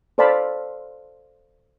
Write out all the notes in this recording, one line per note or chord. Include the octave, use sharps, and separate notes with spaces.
A4 C5 D5 F5 A5 B5